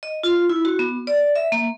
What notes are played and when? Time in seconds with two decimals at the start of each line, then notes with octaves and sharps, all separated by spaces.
0.03 D#5
0.23 F4
0.50 E4
0.65 F#4
0.79 B3
1.07 D5
1.36 E5
1.52 A#3